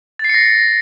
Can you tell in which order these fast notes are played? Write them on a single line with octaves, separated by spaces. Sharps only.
A6 C7 C#7 A#6